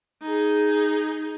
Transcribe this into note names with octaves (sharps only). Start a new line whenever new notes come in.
D#4 G#4